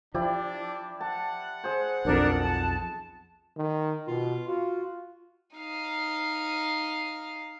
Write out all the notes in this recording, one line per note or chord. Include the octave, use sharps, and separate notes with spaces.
F3 D4 E4 G4 D5
F#5 A5
G#4 C5
B1 F2 D4 A#4
A5
D#3
B2 F4
F4 F#4
D#4 F5